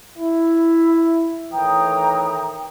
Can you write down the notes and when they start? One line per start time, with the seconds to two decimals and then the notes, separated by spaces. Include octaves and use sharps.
0.18 E4
1.53 A2 D#3 E3 G5 A#5 D#6